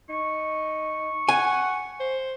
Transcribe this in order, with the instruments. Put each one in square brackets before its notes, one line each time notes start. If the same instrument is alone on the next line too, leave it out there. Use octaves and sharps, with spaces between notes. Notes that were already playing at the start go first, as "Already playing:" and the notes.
[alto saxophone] D#4 [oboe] C#6
[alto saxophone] F#5 [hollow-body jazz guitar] G#5
[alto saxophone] C5